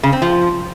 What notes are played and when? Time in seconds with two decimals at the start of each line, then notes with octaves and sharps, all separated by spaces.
0.03 C#3
0.13 C4
0.22 F3